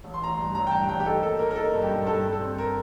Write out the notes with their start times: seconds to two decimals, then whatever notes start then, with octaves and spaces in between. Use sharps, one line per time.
0.04 A1
0.14 C6
0.21 A1 A#5
0.34 G2 C6
0.54 A1 A#5
0.67 G5
0.71 G2 A5
0.88 A1 G5
1.00 G4
1.05 D#4 A4
1.23 A#3 A4
1.39 A#3 A#4
1.51 A#4
1.56 D#4 A4
1.73 G2
1.82 G4
1.90 G2
2.06 G2 A4
2.24 G2
2.32 A4
2.40 C4
2.58 A#4